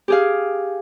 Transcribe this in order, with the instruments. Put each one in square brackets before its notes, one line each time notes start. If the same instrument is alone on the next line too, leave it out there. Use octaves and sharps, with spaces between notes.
[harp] G4 G#4 F5